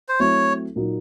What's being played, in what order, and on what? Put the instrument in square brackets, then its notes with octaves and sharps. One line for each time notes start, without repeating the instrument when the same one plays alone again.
[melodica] C5
[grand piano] F#3 A3 C4 E4 [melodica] C#5
[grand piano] A#2 F#3 A#3 D#4